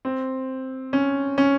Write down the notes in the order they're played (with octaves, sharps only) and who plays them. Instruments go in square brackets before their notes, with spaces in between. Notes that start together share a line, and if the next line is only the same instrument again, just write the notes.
[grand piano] C4
C#4
C#4